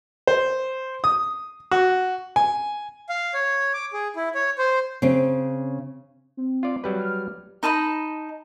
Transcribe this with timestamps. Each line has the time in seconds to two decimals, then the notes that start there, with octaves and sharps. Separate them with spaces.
0.27 C5
1.04 D#6
1.71 F#4
2.36 G#5
3.09 F5
3.34 C#5
3.74 D6
3.93 G#4
4.16 E4
4.35 C#5
4.58 C5
5.02 C#3 C4
6.37 C4
6.63 F4 D5
6.84 F#3 G3 B4
6.99 F6
7.63 D#4 D#5 A5 B5